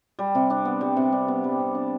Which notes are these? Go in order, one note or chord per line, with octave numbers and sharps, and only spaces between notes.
G3
C3
D4
B3
G3
C3
D4
B3
G3
C3
D4